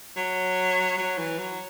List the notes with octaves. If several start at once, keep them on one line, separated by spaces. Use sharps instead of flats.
F#3
F#3
E3
F#3